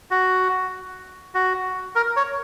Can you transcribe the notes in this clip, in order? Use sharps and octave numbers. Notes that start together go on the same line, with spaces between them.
F#4
F#4
A#4
C#5